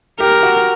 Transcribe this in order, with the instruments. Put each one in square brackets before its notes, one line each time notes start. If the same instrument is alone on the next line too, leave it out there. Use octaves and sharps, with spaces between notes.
[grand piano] G4 [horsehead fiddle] A#4
[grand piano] F#4